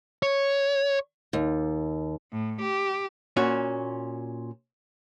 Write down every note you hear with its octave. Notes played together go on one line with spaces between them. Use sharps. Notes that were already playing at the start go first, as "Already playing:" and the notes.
C#5
D#2
A2
G4
A#2 C#4 F#4